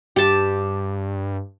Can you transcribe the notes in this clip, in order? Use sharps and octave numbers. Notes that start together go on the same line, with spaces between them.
G2 G4 A5